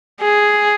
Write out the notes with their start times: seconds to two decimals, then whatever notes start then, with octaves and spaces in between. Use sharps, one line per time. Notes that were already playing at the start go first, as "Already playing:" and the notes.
0.21 G#4